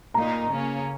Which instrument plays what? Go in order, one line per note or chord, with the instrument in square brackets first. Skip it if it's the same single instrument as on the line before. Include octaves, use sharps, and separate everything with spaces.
[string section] A#2 A#3 D#4 [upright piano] A#5
[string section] C#3 A#3 C#4